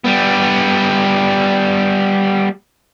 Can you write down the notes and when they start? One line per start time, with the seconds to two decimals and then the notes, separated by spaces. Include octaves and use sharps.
0.04 G3 B3